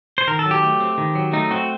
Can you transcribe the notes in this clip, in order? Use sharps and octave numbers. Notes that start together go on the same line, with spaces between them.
C5
D#3 A#4
A4
F#3
G4
A3
C4
D#3
F#3
A3 D#4
C4 F#4